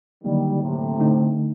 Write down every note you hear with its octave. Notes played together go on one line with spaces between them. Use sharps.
D3 D#3 F#3 G3 A#3
A2 C3
D3 A3 D#4